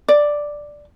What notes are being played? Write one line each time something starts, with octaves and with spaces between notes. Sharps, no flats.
D5